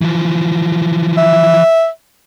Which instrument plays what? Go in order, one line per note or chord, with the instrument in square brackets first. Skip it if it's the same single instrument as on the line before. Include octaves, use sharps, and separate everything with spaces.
[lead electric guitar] E3 F3
[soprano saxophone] E5